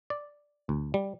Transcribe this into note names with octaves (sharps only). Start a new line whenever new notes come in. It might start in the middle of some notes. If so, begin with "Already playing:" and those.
D5
D2
G3